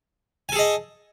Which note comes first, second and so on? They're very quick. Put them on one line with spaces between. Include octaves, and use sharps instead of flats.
G#5 A4 G#4 D#5